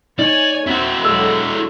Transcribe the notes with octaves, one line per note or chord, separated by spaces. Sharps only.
D#4 C#5 D5 G#5
C4 E4 F#4 E5
D3 F#3 G#3 B5 E6